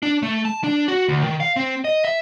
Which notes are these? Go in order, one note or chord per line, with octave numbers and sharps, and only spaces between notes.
D4
A3
A5
D4
F#4
D2
D#3
F5
C4
D#5
E5